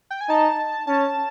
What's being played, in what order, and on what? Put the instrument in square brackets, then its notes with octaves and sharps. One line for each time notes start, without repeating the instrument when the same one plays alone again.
[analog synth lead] G5
G#5
[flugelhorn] D#4 [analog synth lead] A5
[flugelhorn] C#4 [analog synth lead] A5